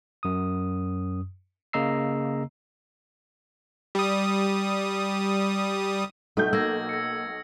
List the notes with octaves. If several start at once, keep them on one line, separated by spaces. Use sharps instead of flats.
F#2 D#6
C#3 A#3 D#5 A#5 E6 C7
G3 D#6
B1 A3 G6
A#3 E6 G#6 A#6
A#6 C#7